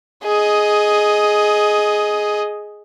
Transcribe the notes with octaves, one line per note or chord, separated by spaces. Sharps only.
G#4 D#5